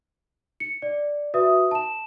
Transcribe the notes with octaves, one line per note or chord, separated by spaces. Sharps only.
C#7
D5
F#4 B4 E5 D#6
A5 E7